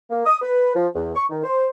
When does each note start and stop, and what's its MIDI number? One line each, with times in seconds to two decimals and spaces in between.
0.10 0.25 58
0.26 0.37 87
0.42 0.73 71
0.75 0.87 53
0.94 1.13 40
1.15 1.24 85
1.30 1.41 51
1.44 1.68 72